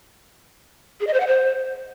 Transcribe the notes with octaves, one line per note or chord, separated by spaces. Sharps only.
G#4
D#5
C5
F#5
C5